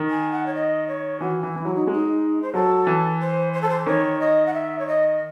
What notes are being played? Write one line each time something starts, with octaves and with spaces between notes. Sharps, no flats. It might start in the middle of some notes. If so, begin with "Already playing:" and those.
Already playing: D#3
G#5
F#5
C#5
D#5
C#5
E3 F#4
E3 E4
E3
F#3 E4
D#4
G#3 D#4
C5
F#3 A4
E3
C5
C5
A4
C5
D#3 C#5
D#5
F#5
E5
C#5
D#5